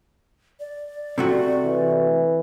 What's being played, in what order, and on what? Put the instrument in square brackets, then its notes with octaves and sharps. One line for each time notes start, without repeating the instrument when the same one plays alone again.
[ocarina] D5
[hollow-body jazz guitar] C3 A3 F#4
[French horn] E3